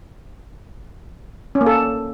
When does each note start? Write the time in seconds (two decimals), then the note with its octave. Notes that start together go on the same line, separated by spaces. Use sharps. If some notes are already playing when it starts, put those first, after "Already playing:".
1.55 C#4
1.61 A#3
1.67 A4